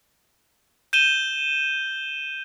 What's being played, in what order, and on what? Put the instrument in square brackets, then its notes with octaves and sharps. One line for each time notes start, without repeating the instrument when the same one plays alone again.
[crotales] G6 D#7 E7 G7